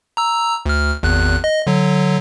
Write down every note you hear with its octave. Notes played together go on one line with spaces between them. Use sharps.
A#5 E6
D2 F6
G#1 E2 F#6
D#5
D3 F#3